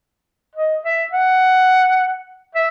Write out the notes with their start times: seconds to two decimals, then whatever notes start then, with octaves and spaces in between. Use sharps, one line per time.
0.55 D#5
0.85 E5
1.12 F#5
2.55 E5